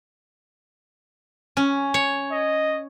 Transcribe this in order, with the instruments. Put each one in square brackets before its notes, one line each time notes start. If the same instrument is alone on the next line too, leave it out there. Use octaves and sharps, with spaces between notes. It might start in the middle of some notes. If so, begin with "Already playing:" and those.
[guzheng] C#4
C#5
[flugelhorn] D#5